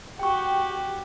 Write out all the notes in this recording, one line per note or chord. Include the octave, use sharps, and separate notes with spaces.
F#4 G4 G5 C#6